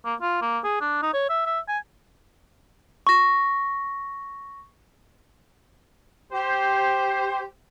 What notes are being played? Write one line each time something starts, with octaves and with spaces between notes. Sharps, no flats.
A#3
F4
A#3
G#4
D4
D#4
C#5
E5
E5
G#5
C#6 A#6
G4 C5